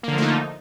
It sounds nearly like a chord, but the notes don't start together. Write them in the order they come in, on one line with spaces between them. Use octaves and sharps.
A#3 D3 F3 A3 D#4